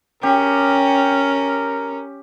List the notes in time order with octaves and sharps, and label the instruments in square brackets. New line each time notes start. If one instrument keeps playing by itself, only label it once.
[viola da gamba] C#4 [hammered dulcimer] G4 [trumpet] A#4